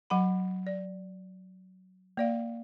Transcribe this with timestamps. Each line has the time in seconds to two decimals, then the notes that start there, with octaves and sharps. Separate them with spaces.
0.10 F#3 F#5 B5
0.67 D5
2.17 A#3 D5 F5